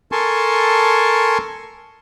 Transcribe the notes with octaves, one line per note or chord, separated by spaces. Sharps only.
A4 A#4 G#5 A5 C6 C#6